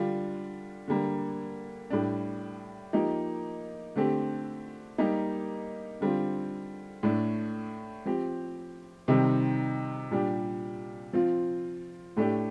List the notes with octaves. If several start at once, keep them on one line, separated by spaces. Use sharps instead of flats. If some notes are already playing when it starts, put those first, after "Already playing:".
Already playing: D3 G3 D4 F4
D3 G3 A#3
A2 G3 D4
F3 A#3 D#4 G4
D3 A3 C4 G4
G3 A#3 D#4 G4
D3 G3 C4 F4
A2 A3 D4
F3 C4 G4
C3 D#3 G3 C4 D#4
A#2 G3 D4 G4
F3 C4 F4
A2 A3 D4 G4